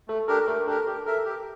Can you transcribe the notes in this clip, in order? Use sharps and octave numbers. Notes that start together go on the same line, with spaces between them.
A3 A4
D4 G4 A4 A#4
A3 A#4
D4 G4 A4 A#4
G4 A#4
A4 A#4 E5
G4